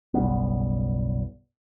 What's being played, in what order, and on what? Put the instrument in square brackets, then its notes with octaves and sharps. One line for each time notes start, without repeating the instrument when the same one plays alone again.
[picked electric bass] F#1 B1 G3 B3